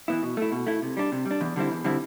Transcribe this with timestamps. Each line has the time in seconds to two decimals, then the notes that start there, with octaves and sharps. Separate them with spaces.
0.08 E3 B3 E4
0.23 B2
0.37 A3 E4
0.52 B2
0.67 A3 E4
0.82 C3
0.97 G3 D4
1.12 C3
1.25 G3
1.31 D4
1.41 E2
1.56 D3 G3 C4 E4
1.71 E2
1.84 D3 G3 C4 E4